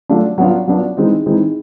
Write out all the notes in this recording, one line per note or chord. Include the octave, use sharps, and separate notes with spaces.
F#3 A3 D4 F4
F#3 B3 D4 F4
F#3 B3 D4 F4
E3 G#3 C4 D#4
E3 G#3 C4 D#4